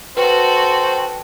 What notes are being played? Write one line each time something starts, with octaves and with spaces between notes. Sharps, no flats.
F#4 A4 B4 C5 G5